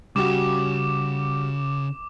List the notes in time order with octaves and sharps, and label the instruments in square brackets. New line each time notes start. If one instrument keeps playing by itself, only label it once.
[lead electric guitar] C#3 [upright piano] G3 F#4 [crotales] D6 E7